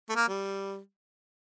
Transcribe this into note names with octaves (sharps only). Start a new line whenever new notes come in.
A3
A#3
G3